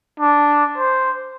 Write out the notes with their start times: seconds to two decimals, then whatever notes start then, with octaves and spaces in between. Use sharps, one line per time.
0.20 D4
0.78 C5